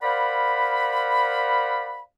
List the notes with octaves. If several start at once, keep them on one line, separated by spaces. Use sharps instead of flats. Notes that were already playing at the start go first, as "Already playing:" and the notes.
A#4 C5 D5 F5 F#5 B5